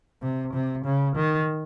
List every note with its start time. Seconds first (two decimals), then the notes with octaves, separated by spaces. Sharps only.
0.22 C3
0.54 C3
0.85 C#3
1.16 D#3